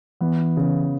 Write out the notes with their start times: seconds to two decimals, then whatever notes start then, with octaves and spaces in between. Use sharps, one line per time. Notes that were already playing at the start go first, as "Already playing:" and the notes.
0.21 E3 B3
0.57 C#3